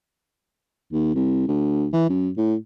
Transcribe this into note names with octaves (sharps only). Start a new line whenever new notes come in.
D#2
C2
D2
E3
F#2
A2